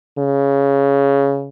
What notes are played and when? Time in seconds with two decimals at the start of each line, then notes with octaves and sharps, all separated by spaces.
0.18 C#3